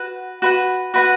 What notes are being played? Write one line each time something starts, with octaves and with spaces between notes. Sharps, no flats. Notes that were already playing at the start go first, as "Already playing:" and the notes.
Already playing: F#4 B4 F#5
F#4 B4 F#5
F#4 B4 F#5